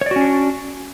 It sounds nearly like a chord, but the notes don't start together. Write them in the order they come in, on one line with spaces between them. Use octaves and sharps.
C#5 D5 F#4 C#4 D4